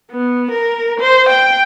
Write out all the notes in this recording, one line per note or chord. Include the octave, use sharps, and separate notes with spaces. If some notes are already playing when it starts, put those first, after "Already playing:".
B3
A#4
C5
G5